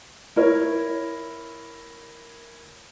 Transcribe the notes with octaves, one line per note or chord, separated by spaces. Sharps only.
E4 A#4 C#5